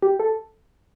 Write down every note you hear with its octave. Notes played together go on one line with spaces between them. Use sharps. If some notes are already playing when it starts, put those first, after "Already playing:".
G4
A4